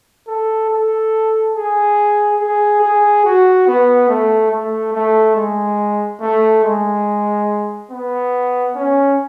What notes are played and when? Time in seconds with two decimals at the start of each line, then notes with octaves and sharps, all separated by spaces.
0.28 A4
0.71 A4
1.55 G#4
2.40 G#4
2.82 G#4
3.25 F#4
3.67 B3
4.09 A3
4.51 A3
4.93 A3
5.36 G#3
6.21 A3
6.64 G#3
7.91 B3
8.75 C#4